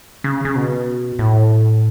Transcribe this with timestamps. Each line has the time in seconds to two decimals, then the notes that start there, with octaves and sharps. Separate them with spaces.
0.24 C#3
0.45 C#3
0.56 B2
1.19 A2